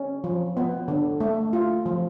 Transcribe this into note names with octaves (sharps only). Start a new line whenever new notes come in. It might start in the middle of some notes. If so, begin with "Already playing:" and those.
Already playing: C#4
F3
B3
D3
A3
F4
F3